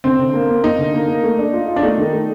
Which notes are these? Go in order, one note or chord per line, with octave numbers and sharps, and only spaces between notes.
D3 C4
D3
A#3
A#3
A#3 D#4
D3
A#3
A#3
A3
D4
F4
F4
D4
A3 D#4
D#3
A3